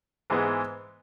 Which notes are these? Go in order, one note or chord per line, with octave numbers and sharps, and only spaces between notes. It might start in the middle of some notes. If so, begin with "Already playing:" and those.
G#2 E3 G#3 B3